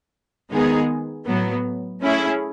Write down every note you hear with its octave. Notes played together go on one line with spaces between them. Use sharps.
D#3 G#3 B3 D#4 G#4
A2 F#3 B3
A3 C#4 E4 G#4